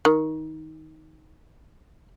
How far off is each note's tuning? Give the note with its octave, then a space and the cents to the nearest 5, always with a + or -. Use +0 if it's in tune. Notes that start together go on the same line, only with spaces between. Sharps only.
D#3 +15